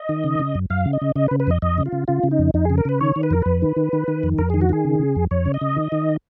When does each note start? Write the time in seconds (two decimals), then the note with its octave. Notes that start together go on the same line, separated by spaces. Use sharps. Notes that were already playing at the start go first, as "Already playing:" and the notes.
Already playing: D#5
0.09 D#3
0.24 C#3
0.39 C#3
0.55 F#2
0.70 F#2 F5
0.86 C#3
0.93 D#5
1.01 C#3
1.16 C#3 D#5
1.28 B4
1.31 C#3
1.40 B4
1.47 F2 D#5
1.62 F2 D#5
1.78 C#3
1.86 F4
1.92 C#3
2.08 C#3 F4
2.23 C#3
2.31 D#4
2.39 F2
2.54 F2 D#4
2.65 C#3 G#4
2.78 A#4
2.85 C#3 B4
3.01 D#3 C#5
3.16 D#3
3.23 B4
3.31 F2 A#4
3.42 F2 B4
3.62 D#3
3.76 D#3
3.93 D#3
4.08 D#3
4.23 F2
4.38 F2 A#4
4.50 D#3 G#4
4.61 F#4
4.69 D#3 G#4
4.85 C#3
5.00 C#3
5.16 F2
5.31 F2 C#5
5.46 C#3
5.54 D#5
5.61 C#3
5.76 D#3
5.92 D#3